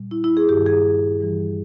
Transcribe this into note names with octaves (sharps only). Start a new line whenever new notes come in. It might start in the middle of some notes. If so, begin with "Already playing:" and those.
Already playing: A#2 G3
E4
E4
G#4
G2 D#3 G3 G4
G#4
G2 E3 G3